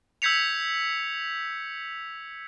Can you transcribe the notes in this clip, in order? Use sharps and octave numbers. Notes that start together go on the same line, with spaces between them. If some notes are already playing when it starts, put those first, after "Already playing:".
E6 G6 G#6 B6 C#7 F7